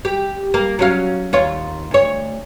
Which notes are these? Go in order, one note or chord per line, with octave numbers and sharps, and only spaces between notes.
G4
A#3
F#3 C#4 F5
D#2 F4 C#5
D2 C#5